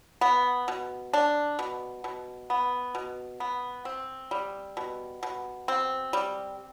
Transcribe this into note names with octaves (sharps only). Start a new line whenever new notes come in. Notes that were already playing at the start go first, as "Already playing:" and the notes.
B3
B2
D4
B2
B2
B3
B2
B3
C4
G3
B2
B2
C4
G3